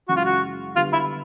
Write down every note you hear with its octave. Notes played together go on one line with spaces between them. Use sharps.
F#2 C#3 E3 G#3 F#4
F4
F#4
D3 G3 B3 F4
E4